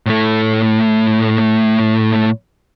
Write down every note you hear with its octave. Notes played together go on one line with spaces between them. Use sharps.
A2 A3